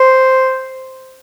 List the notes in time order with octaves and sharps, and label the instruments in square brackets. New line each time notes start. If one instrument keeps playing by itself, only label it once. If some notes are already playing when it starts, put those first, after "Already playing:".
Already playing: [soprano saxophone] C5